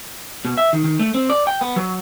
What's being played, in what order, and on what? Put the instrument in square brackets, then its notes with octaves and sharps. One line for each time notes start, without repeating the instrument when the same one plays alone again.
[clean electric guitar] B2
E5
D#3
D#3
A3
C4
D5
G5
B3
F#3